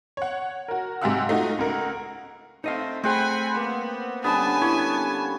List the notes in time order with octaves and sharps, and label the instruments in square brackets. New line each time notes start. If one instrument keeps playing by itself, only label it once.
[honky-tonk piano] C#5 F#5
F#4 A#4
G#2 C3 G4 F5 F#5 E6
A3 D#4 F4 F#4
C#2 A#4 F#5
[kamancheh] A3 C4 [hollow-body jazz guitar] D#4 D#5 F5
[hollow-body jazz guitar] A3 G#4 [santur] C4 F#5 [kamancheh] G#5 B5
[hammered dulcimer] A#3 [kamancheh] B3
[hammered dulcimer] D3 G3 C#4 [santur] B3 [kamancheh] G#5 A5
[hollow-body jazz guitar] E4 G4 [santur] C#5